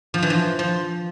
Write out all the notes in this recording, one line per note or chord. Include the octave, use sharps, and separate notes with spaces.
F3
E3
F3
F3